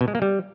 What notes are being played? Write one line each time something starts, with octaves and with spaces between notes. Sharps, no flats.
B2
G#3
A#3
G3